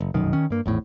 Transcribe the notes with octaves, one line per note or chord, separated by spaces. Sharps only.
F#1
F1 B1 F#2 D#3
D#3 C#4
G2 A#3
G#1 E2 A2